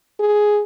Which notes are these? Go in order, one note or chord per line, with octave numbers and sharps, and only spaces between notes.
G#4